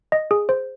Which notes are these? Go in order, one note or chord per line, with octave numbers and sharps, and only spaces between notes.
D#5
G#4
C5